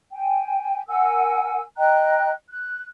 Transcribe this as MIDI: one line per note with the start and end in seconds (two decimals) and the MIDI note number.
0.12 0.81 79
0.12 0.81 80
0.88 1.62 70
0.88 1.62 78
0.88 1.62 80
0.88 1.62 88
1.78 2.31 75
1.78 2.31 79
1.78 2.31 82
1.78 2.31 90
2.49 2.86 90